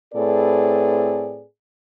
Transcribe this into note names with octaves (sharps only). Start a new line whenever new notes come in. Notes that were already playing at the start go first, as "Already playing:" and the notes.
A2 C4 G#4 A4 B4 D5